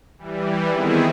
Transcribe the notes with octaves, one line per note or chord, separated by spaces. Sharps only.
E3 G3
D#3 B3 C4 E4 G#4